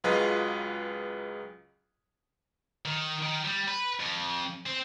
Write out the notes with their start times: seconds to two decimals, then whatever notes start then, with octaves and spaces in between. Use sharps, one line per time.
0.04 C#2 F#3 F4 G#4 B4 D#5
2.85 D#3
3.23 D#3
3.45 G3
3.68 B4
4.00 F2
4.67 C4